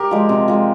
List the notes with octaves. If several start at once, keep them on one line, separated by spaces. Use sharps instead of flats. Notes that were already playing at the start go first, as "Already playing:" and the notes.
Already playing: G4 A#4
F3 G#3
C3
F3 G#3